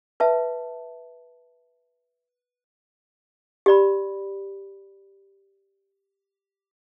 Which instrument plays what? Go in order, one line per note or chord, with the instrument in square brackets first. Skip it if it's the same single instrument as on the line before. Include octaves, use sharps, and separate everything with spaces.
[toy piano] B4 E5 A5
G4 D5 B5